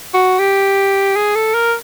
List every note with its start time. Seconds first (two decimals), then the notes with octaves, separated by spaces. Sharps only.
0.14 F#4
0.39 G4
1.16 G#4
1.35 A4
1.54 A#4